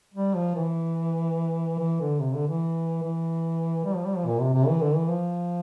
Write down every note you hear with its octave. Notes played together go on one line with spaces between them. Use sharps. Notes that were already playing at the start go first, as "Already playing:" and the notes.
G3
F3
E3
E3
D3
C3
D3
E3
E3
G3
F3
G3
F3
A#2
C3
C3
E3
D3
E3
F3